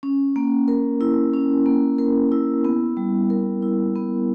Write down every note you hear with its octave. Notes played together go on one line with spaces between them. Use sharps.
C#4
A#3
A#4
E4
C#4
A#3
A#4
E4
B3
G3
A#4
E4
B3